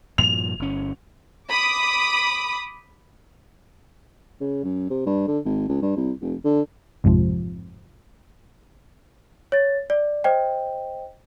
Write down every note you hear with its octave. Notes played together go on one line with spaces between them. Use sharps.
G2 A#2 F3 F7
G1 C#4
B5 D6 D#6
C#3
F#2
C3
G2
D3
G#1
C#2
G2
C2
F1
D3
A1 F2 G#2 C3 F3
C#5 A6
D5
C5 D#5 G5